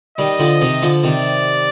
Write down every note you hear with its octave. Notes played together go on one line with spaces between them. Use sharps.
D#3 G3 D#5
D3 F3
C3 D#3
D3 F3
C3 D#3 D5